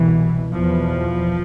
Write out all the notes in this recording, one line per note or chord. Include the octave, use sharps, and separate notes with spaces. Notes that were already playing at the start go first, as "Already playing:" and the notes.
Already playing: C2 B2 E3
E2 B2 F3